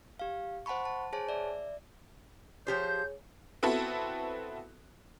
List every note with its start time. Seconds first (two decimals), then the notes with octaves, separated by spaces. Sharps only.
0.19 G4 F5
0.66 C5 F#5 A5 B5 C#6
0.85 A5
1.13 G#4 C5 C#5 G#5 A5
1.29 D5 E5
2.67 F3 G4 G#4 C5 C#5 G6
3.63 B3 C4 E4 F#4 A4